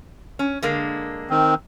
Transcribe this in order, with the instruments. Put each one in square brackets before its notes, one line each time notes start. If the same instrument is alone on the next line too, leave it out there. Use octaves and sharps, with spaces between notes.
[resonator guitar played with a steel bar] C#4
D3 G#3 A#3
[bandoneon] D#3 C4